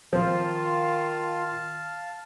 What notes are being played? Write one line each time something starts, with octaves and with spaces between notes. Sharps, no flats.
D#3 F3 C4 F4 F5 A5